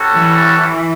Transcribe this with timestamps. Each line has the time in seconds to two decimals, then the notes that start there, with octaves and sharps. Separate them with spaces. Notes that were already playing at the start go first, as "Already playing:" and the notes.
Already playing: G3 C#4 F#4 A4
0.14 E3